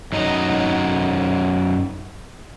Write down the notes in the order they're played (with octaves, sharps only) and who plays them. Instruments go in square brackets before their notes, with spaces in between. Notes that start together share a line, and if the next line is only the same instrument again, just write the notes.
[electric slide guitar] F#2 F#3 D#4 D#5